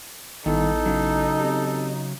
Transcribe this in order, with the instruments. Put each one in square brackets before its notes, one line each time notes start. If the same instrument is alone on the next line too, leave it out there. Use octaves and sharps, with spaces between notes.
[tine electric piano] A1 B3 E4 [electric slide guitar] G2 D#3 [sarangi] D#4 [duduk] A4
[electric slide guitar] C#3 F#3
[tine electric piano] C4 G4